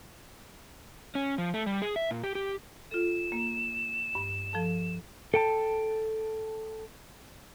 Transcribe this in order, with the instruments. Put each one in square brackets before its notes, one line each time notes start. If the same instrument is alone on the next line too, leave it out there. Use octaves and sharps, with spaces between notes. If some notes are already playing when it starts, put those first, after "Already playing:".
[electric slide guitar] C#4
F3
A3
G3
G#4
E5
A#2
G4
G4
[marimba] F4 A4 [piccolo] E7
[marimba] A#3
G2
F3 A4 A5
[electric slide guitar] A4 G5 A5